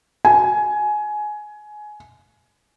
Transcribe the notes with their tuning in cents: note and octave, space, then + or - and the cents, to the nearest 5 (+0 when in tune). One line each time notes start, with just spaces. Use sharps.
G#5 +15